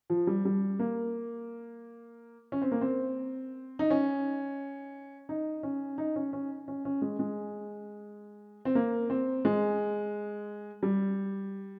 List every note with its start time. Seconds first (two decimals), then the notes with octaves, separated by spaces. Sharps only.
0.10 F3
0.27 G3
0.45 G3
0.79 A#3
2.52 C#4
2.62 C4
2.72 A#3
2.81 C4
3.79 D#4
3.90 C#4
5.29 D#4
5.63 C#4
5.98 D#4
6.16 C#4
6.33 C#4
6.68 C#4
6.85 C#4
7.02 G#3
7.19 G#3
8.65 C4
8.75 A#3
9.10 C4
9.45 G#3
10.83 G3